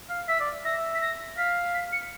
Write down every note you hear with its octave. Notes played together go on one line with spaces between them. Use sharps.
F5
E5 B6
D5
E5 A#6
B6
A#6
F5 B6
B6
C#7